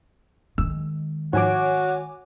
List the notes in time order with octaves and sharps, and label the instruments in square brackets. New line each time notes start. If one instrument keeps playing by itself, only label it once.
[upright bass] D#3 G#3 [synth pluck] E6
[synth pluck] G#2 F3 [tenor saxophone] F#4 [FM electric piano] C#5 G#5 D6